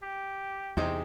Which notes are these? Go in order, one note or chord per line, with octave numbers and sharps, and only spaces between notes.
G4
E2 C3 C4 D#4 G4 G#4 C5